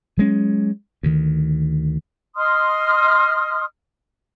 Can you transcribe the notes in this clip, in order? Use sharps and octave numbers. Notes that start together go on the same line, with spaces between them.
F#3 G#3 C#4
D2 D#3
D#5 C6 D#6 F6